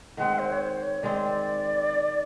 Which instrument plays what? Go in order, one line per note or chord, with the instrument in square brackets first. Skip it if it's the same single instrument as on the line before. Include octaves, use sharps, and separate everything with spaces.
[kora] D#3 G#3 C4 [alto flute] F#5
[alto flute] C5
C#5
C5
C#5
[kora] D#3 G#3 C4 [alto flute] D5